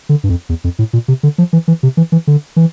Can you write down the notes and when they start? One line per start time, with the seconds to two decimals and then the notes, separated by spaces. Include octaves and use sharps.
0.09 D3
0.24 G2
0.29 F2
0.49 E2
0.64 F2
0.79 A2
0.93 A#2
1.08 C3
1.23 D3
1.38 F3
1.53 E3
1.68 E3
1.83 C3
1.97 E3
2.12 E3
2.27 D3
2.56 E3